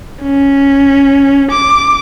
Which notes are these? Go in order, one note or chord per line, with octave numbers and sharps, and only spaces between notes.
C#4
D6